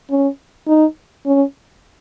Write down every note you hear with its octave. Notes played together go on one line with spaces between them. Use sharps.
C#4
D#4
C#4